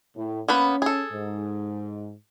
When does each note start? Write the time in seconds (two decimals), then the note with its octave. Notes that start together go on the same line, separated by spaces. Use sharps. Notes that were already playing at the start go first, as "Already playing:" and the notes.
0.16 A2
0.48 A#3 B3 C#4 B4
0.82 G#4 A4
1.12 G#2